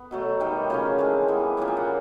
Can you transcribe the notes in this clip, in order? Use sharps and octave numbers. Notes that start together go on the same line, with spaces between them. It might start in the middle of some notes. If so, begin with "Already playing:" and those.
Already playing: B3
B2 F#3 A3
D#3 G3 B3 G5
C#3 F3 A#3 C#4 G#5
E3 G#3 C4 A5
E3 G3 B3
A#2 F3 A#3 C#4 G#5
G5
F#5